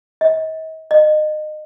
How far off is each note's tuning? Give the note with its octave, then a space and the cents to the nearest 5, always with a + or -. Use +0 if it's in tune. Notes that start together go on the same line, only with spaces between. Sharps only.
D#5 +40
D#5 -25